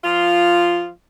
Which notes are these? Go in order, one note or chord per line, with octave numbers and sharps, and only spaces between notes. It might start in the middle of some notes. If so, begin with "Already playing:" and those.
F3 F4